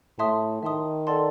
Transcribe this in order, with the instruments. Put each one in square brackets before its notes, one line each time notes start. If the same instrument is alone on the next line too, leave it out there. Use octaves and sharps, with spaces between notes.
[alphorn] A2 [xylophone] E5 A5 C6 D#6
[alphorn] D#3 [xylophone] E5 A5 C6 D#6
[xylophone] A4 D5 F#5 A5 C6